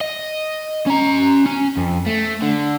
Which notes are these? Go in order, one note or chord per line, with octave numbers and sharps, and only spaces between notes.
D#5
C#4 A#5
C#4
F2
A3
D3